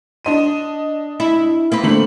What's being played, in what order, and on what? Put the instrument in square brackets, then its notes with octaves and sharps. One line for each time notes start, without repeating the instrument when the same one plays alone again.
[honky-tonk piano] D4 D#5 D#7
[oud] E4
A#3 C4 B4
[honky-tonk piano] D3 A3 F#7